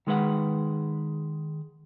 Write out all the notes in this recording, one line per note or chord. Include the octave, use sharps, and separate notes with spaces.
D#3 G#3 B4 F#5